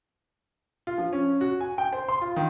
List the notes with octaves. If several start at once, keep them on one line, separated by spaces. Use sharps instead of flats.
F4
F3
C#4
F#4
G#5
G5
C5
C6
F4
D#3